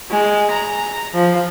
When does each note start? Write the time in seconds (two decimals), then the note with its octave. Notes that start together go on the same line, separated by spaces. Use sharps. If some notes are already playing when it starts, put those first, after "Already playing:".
0.11 G#3
0.51 A#5
1.14 F3